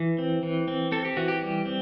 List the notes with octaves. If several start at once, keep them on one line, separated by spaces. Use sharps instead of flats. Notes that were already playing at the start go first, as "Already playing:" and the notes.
Already playing: E3
C4
E3
C4
C4 A4
G4
E3 F#4
G4
G3
C4